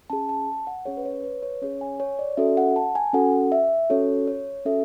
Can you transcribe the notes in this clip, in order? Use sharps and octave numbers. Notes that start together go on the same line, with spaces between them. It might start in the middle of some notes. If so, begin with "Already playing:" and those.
C#4 G#4 A5
A5
F#5
C#4 G#4 C#5
B4
C#5
B4
C#5
C#4 G#4 C#5
G#5
C#5
D5
C#4 F#4 A4 E5
F#5
A5
G#5
C#4 F#4 A4 F#5
E5
C#4 F#4 A4 C#5
C#5
C#4 F#4 A4 E5